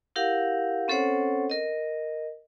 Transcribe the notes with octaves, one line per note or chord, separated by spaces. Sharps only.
E4 G4 A#4 F5 F#5
C4 C#4 A4 C5 C#5 F#5
A#4 D#5